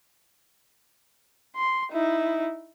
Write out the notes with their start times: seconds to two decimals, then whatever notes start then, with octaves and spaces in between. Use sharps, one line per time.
1.56 C6
1.92 D#4 E4